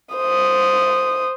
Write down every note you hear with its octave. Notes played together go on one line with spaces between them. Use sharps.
C5 D#6